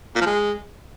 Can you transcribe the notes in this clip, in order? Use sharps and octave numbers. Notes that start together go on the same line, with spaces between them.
A#2
F3
G#3